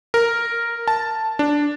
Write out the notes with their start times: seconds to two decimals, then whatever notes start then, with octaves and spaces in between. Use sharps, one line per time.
0.14 A#4
0.88 A5
1.39 D4